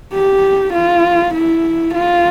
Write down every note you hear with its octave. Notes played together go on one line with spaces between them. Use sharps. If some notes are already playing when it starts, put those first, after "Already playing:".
G4
F4
E4
F4